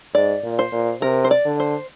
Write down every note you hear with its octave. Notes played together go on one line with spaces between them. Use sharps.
G#2 D5
A#2
C5
A#2
C3 A#4
C5
D5
D3
C5